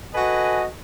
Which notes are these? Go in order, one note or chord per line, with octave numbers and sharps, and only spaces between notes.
F#4 A4 B4 D#5 G#5